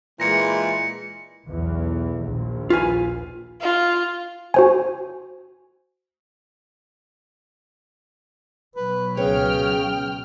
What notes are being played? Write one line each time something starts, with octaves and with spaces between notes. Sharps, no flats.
A#2 E3 G#3 A#6 C#7
B1 E2
A#1 D#2
F4 B4 G#5
F4
F#4 C5 G#5
B2 F#3 B4
C#2 C#3 B4 C#5 G5 F6